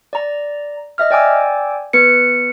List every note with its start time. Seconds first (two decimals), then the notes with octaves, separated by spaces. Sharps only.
0.13 D5 A#5
0.98 D#5 E5 F6
1.11 D5 G5 G#5 D6 E6
1.93 B3 B4 C#7